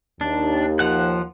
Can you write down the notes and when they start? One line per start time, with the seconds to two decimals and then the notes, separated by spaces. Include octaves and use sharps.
0.21 D#2 D4
0.79 F3 F#5 F#6